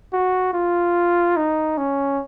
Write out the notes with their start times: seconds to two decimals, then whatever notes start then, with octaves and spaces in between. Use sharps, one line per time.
0.13 F#4
0.53 F4
1.37 D#4
1.78 C#4